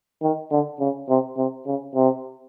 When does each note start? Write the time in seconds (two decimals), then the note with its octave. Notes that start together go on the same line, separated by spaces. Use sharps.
0.22 D#3
0.51 D3
0.80 C#3
1.09 C3
1.37 C3
1.66 C#3
1.95 C3